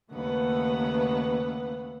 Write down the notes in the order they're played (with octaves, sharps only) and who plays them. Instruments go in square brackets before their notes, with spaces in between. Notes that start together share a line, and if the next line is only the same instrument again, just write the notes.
[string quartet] D#2 C#3 A3 B3 B4 F#5